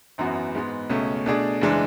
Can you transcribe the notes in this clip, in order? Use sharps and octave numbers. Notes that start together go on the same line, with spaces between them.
G#1 F#2 E3 B3 F#4
G#2 G#3 B3
C#2 B2 A3 C#4
B2 A3 D4 G#4 D5
F#1 E3 G#3 D4